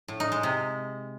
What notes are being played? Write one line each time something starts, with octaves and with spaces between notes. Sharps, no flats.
A2
D#4
G#3
C3